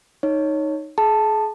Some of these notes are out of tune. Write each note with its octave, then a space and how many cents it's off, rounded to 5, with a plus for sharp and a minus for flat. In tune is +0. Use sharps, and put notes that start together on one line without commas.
D#4 +0 C#5 +0
G#4 +35 A5 +0